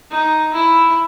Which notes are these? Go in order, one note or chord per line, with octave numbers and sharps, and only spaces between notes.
D#4
E4